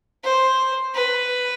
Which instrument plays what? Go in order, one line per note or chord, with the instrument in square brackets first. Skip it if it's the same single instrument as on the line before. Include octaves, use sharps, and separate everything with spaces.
[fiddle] C5
B4